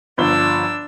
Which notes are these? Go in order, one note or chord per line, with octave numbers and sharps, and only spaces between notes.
G1 F3 D4 E6 G7